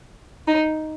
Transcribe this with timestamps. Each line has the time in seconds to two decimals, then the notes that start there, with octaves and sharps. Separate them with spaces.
0.48 D#4